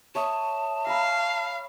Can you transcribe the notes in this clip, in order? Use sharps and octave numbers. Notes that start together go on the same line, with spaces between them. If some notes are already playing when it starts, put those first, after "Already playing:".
C#5 E5 A5 D#6
F5 A#5 B5 E6